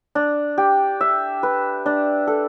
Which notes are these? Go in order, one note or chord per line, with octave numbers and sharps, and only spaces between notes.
D4
G4
E5
B4
D4
A4